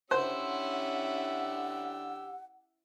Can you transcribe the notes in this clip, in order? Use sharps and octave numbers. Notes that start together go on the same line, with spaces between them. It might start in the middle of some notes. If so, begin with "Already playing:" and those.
D3 C#4 E4 G4 C5 F#5 E6